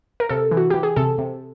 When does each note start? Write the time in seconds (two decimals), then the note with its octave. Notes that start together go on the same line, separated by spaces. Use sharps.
0.20 A#4
0.29 C3 A4
0.51 E3
0.57 F#4
0.70 E3 G4
0.83 G#4
0.96 C3 A4
1.18 C3